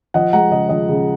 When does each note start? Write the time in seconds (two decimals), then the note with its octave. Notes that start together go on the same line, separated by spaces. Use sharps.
0.14 F3 D#5 F#5
0.33 G#3 F#5 A#5
0.51 C#3 D#5
0.69 F3 D#5
0.89 C#3